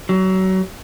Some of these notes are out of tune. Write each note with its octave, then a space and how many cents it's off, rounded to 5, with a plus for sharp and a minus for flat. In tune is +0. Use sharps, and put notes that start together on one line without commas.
F#3 +30